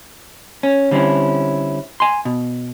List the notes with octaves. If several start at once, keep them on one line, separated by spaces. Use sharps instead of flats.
C#4
D3 G3 C4 C#4 E4
G#5 C6
B2